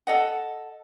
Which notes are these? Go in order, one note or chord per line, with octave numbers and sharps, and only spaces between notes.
A4 D#5 F#5